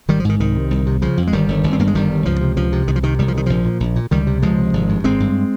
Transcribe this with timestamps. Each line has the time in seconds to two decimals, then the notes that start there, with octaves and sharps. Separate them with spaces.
0.08 G#1 D#3 G3
0.20 F3
0.25 G#2 D#3
0.40 C2 D#3
0.56 C3
0.71 C2
0.87 C3
1.02 C#3 F3
1.17 F2
1.27 G#3
1.32 G1 D#3 G3
1.48 G1
1.64 G1
1.73 C4
1.79 G2 A#3
1.87 G#3
1.95 G1 D#3 G3
2.10 G2
2.25 C#2 F3
2.41 C3
2.57 C#2 F3
2.72 C3
2.88 C2 D#3
2.96 F3
3.03 C3 D#3
3.19 C2 G3
3.28 F3
3.35 C3 D#3
3.46 A#1 F3
3.65 A#2
3.80 A#1
3.96 A#2
4.11 C#2 D#3 G3
4.27 C3
4.42 C#2 F3 G#3
4.58 C3
4.73 G#1
4.89 G2
5.04 G#1 G#3 C4
5.20 G2